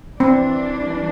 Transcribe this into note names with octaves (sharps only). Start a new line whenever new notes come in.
E3 G3 C4 D4